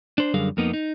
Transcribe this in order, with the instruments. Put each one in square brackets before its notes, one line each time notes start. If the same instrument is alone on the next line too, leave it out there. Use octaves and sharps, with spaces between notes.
[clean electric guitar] D4 C5
F#2 D3 G3 G#4 A#4 F5
F2 A#3 B3 D#4
D#4